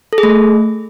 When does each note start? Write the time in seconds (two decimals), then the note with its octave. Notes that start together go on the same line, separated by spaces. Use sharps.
0.13 A4
0.18 G#4
0.23 A3